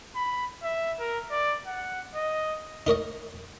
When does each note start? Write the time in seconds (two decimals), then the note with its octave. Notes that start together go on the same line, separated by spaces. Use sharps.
0.16 B5
0.63 E5
1.00 A#4
1.31 D5
1.66 F#5
2.15 D#5
2.87 D#4 A#4 C#5 D#5